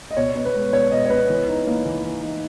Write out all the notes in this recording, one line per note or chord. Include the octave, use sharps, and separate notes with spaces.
D#5
B2 C#5
B3
B4
G#3
B2 C#5
B2 D#5
C#5
B3 B4
E3
D#4
A#3
E3
E3
D#4